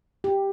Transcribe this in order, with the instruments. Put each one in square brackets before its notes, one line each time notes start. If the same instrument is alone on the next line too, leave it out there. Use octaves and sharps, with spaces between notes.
[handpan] G4